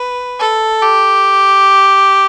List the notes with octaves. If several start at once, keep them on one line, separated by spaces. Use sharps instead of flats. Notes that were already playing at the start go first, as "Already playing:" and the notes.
Already playing: B4
A4
G4